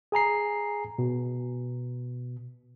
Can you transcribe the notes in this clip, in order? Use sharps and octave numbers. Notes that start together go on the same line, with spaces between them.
G#4 G#5 A#5 C7
B2